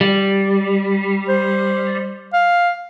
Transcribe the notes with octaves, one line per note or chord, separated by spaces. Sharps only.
G3
C5
F5